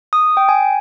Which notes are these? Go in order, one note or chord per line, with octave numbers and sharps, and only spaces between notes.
D#6
G5
G#5